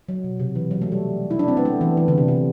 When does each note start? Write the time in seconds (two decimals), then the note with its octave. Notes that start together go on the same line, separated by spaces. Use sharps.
0.09 F#3
0.24 B2
0.40 C3
0.55 E3
0.71 F#3
0.82 A3
0.92 G3
1.31 E4
1.39 D4
1.48 C4
1.57 B3
1.65 A3
1.81 E3
1.97 E3
2.08 D3
2.18 C3
2.28 C3